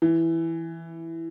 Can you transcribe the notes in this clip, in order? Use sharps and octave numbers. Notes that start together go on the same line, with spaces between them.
E3